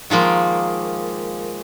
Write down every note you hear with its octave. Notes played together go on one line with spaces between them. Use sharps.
D#3 F3 G#3 A#3